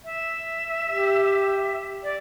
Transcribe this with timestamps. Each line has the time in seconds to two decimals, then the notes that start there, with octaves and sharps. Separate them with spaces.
0.04 E5
0.90 G4
2.03 D5